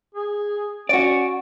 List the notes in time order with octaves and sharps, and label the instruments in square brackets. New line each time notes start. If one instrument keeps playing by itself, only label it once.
[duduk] G#4
[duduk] C#4 [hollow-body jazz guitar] F#4 D5